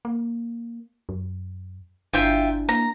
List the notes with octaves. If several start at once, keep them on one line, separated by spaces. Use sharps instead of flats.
A#3
F#2
G1 D4 E4 F4 E5 G5
A#3 A#5